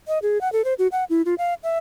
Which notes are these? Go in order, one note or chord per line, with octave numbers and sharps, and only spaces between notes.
D#5
G#4
F#5
A4
C5
F#4
F#5
E4
F4
F5
E5